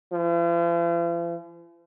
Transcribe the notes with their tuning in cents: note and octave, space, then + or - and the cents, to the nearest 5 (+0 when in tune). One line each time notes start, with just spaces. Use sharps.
F3 -45